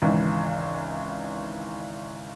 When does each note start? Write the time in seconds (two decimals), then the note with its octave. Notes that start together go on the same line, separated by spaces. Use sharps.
0.02 G#1 C#2 D#3 E3